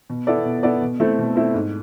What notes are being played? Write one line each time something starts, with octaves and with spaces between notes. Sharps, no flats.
B2
B3 E4 A4 D5
B2
B3 E4 A4 D5
B2
A3 C4 E4 A4
B2
A3 C4 E4 A4
G#2